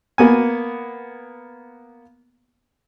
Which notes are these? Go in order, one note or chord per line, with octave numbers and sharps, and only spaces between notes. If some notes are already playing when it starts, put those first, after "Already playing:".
A#3 B3 G#5